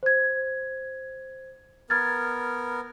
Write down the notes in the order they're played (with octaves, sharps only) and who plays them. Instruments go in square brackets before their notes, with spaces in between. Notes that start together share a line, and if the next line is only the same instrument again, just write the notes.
[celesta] C5 G#6
[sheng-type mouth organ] B3 A#4 [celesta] F6 G#6 A6